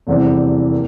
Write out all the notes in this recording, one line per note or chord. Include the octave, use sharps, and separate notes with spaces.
F1 E2 E3 G3 C4
A#3